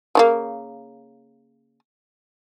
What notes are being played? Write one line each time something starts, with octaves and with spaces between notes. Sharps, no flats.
C#3 F3 A#3